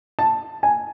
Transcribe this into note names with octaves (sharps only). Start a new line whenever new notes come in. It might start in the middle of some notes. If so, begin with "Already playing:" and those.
A5
G#5